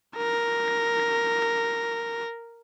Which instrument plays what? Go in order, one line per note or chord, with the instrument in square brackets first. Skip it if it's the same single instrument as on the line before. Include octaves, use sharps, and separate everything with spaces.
[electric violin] A#4 A#6